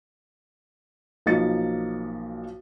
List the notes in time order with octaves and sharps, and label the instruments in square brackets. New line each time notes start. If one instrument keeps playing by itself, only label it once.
[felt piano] B1 F3 A#3 D#5 A6 C#7